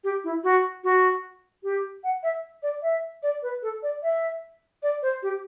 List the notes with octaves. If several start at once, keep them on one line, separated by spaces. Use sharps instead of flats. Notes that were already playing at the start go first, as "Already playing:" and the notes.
G4
E4
F#4
F#4
G4
F#5
E5
D5
E5
D5
B4
A4
D5
E5
D5
C5
G4